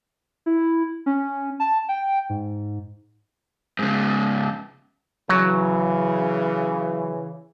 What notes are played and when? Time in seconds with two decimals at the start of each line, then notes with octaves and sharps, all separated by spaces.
0.46 E4
1.06 C#4
1.60 A5
1.89 G5
2.29 G#2
3.79 G#2 C#3
5.29 C#3 E3 F#3